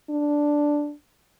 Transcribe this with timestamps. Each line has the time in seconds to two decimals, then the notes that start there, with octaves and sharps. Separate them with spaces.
0.10 D4